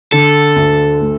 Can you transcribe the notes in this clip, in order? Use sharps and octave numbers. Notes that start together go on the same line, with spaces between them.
D3 A4
D2
A3